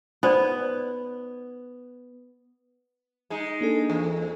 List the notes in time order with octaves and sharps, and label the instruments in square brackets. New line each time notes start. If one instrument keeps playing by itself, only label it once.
[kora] B3 [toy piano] D#4 C5 D5
[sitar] G#3 D#4
[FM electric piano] A#3 D4 A4
[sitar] E2